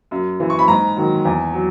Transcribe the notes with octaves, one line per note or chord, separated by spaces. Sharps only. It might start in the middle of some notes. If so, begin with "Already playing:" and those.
F#2
E3
C#6
B5
G#2 A#5
D#3 F#3
E2
F#3